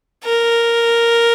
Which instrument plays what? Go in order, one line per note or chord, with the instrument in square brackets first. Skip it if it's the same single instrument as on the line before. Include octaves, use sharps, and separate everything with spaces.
[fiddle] A#4